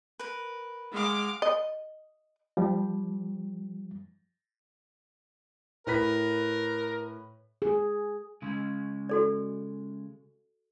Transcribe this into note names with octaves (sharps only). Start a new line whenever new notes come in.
A#4 B4
G#3 F5 F#5 D6
D#5
F3 G3
A2 A#4 B4 B6
G#4
C#3 G#3
F#4 A4 D5